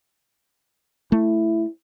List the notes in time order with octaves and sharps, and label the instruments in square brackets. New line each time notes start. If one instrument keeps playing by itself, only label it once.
[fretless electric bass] A3 [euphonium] E4